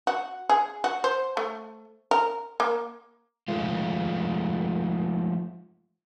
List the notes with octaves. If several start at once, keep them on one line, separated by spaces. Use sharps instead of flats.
F#4
G#4
F#4
C5
A3
A#4
A#3
F3 G#3 A3 F4